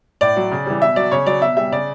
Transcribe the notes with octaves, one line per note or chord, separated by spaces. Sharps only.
A2 D5
F#3
C#3
E3 G3
B2 E5
F#3 D5
C#3 C#5
F#3 D5
B2 E5
G3 E5
C#3 D5